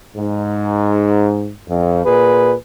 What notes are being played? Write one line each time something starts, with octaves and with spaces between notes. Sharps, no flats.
G#2
F2
A#2 G#4 B4